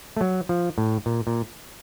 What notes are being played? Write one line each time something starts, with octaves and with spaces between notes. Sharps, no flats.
A3
F#3
F3
A2
A#2
A#2